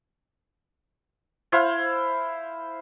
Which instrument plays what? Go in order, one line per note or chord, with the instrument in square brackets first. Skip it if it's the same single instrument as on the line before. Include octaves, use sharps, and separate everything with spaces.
[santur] E4 C5 F5